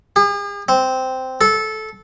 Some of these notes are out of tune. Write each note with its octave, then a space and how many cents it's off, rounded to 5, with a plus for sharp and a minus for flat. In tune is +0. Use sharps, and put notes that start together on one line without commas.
G#4 -45
C4 -10
A4 -15